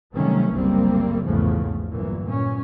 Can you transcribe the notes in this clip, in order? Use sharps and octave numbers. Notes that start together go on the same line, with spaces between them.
C3 D#3 F#3 G3 A3 C#4
F#1 C2 F#2 G3 A#3 C4
A#1 E2 G#2 C#3 F3 A3
G1 F#2 A#2 E3
A#2 C#4